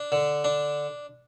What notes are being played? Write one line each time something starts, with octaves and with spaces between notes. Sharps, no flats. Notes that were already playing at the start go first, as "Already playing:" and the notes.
Already playing: D4
D3
D4